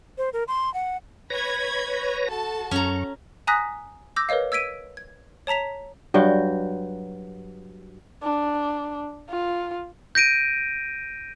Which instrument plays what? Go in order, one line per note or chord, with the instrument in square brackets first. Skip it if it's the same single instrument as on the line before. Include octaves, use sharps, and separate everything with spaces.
[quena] C5
A#4
C6
F#5
[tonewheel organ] B4 C#5 A#6 [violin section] B5 G#6
[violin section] F#4 A4 A5
[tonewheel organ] F#2 C#6 [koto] C#4 A#5
[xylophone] G#5 A#5 D#6 F#6 A#6 B6
D6 E6 G6 A#6
A#4 B4 C#5 D#5 F5
E6 G#6 B6 D7 D#7
G#6
C#5 A5 A#5 B6 F7
[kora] G2 F#3 G5
[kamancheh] D4
F4
[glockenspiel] G6 A#6 D7 D#7